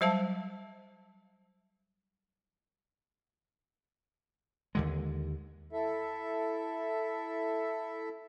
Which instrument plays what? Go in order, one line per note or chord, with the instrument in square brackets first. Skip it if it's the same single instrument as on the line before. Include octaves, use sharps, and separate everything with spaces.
[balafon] F#3 G3 C5 E5 F5 A5
[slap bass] D#2 D3 G#3
[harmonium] E4 A4 E5